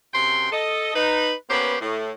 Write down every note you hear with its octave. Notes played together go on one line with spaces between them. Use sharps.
F#2 C3 G5 C6
A4 D#5
D#4 B4
A#3 B3 C#4 G4 B4 C5
A2